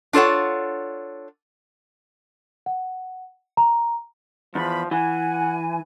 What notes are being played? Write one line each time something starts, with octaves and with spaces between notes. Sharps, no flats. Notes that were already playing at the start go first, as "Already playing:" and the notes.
D4 F4 A4 C#5 F#5
F#5
A#5
E2 F3 B5
E3 F#5 G#5